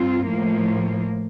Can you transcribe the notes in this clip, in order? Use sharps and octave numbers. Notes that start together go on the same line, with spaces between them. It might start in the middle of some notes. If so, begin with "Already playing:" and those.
Already playing: G2 C4 F4
A2 F3 A#3